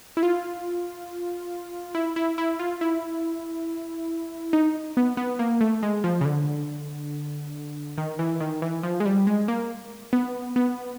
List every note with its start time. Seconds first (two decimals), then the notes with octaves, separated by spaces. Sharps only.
0.17 E4
0.23 F4
1.95 E4
2.16 E4
2.38 E4
2.60 F4
2.81 E4
4.53 D#4
4.97 B3
5.17 B3
5.39 A#3
5.61 A3
5.83 G#3
6.04 F3
6.21 C#3
6.25 D3
7.98 D#3
8.19 E3
8.41 D#3
8.62 E3
8.83 F3
9.00 G#3
9.05 G3
9.27 G#3
9.48 A#3
10.13 B3
10.56 B3